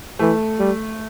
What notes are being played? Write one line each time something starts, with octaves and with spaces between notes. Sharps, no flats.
E3 A3
G3